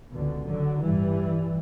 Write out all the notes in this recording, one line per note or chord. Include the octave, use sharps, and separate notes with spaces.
C#2 B2 D3
D3 F#3
A1 G2 E3 G3